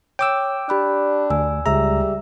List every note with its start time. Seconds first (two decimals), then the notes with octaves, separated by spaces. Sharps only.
0.19 C#5 G5 D6 E6
0.69 D4 G4 B5 F#6
1.30 D2 G#5 E6
1.66 C#2 G3 G#4 E5 A#5 E6